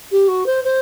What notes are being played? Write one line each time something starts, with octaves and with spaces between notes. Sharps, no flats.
G4
F#4
C5
C5